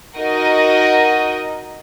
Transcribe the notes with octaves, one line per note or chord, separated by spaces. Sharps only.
D#4 F#4 A#4 D#5